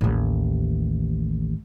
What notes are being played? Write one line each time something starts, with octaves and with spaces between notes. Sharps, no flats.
A1 D#2